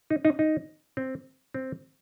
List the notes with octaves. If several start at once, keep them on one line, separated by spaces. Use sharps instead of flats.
D#4
D#4
D#4
C4
C4